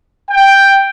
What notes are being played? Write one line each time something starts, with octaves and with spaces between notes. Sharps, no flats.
G5